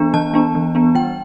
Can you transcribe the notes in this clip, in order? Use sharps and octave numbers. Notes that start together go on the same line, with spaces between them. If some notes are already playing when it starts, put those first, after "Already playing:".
Already playing: E3 B3 D4
E3 A5
B3 D4
E3
B3 D4
G3 G5